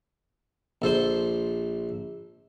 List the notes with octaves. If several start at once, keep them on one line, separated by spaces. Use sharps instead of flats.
A#1 A4 C5 C6